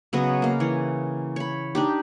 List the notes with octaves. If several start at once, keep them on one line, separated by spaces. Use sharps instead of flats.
C#3 F#3 B3 D#5
A#3 F5
E3 C#5
C#5 B5
D4 D#4 G4